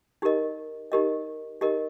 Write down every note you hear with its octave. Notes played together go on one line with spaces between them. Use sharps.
D#4 G4 A#4 D#5
D#4 G4 A#4 D#5
D#4 G4 A#4 D#5